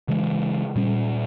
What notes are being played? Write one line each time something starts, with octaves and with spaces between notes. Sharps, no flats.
C#3 E3 G#3
A#2 G3 C#4